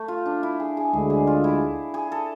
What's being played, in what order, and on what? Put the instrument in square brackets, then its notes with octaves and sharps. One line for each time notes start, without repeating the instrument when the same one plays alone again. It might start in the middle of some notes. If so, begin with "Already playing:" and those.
Already playing: [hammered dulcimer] A3
F4
D4
E4
G#4
G#4
[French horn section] D2 D3 G#3 [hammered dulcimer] G#4
[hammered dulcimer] G#4
F4
E4
G#4
A4